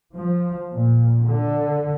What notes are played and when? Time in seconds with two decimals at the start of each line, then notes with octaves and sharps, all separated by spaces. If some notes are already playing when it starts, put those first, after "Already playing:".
0.16 F3
0.73 A#2
1.27 D3